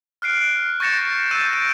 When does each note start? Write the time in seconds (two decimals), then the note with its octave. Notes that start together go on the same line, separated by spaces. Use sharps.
0.22 F6 F#6 C7 D7
0.80 C#6 G6 A6 A#6 C#7 E7
1.31 E6 G6 A6 D#7 E7
1.50 A#6 D7